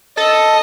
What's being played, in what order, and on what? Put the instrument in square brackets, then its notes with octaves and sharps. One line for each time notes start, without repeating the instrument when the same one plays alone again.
[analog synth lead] A4 [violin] D#5